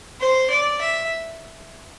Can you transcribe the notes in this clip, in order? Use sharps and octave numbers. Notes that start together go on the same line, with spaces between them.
C5
D5
E5